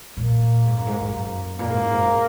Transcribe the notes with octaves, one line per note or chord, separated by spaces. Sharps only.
A#2 A#3
G#2
F#2
G#2
G#2
F#2
A#2 A#3
G#2
F#2
G#2
A#2